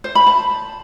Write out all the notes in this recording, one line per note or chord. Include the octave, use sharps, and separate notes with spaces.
C5
B5
A5